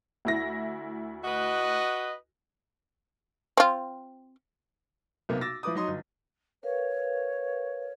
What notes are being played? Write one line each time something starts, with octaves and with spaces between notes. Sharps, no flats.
D2 E4 A#6
F#4 B4 D#5
C4 F4
B1 C3 A#3 B3
D6 E6 A6 A#6
F3 E4 B4 D6 D#6
F#3 D#4 D#5 C6 D#6
G1
A#4 B4 C#5 F5